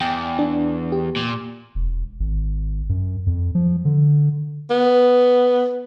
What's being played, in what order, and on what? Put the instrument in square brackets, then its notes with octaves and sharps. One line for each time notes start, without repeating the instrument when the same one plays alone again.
[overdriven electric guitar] E2 [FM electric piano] G5
[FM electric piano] D4
G4
[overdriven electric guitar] A#2
[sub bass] E1
G#1
F#2
F2
F3
D3
[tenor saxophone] B3